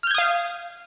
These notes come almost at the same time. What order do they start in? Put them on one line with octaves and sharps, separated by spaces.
F6 G6 G#6 D#6 F5